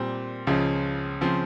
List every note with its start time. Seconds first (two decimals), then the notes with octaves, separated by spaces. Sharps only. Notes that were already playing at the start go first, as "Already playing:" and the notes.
Already playing: A#2 G3 C4
0.47 C#2 C#3 F3
1.21 C#3 F3 C4